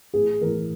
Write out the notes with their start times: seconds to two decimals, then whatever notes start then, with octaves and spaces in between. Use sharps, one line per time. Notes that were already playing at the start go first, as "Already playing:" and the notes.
0.14 A1 G#4
0.41 A2 E3 A#4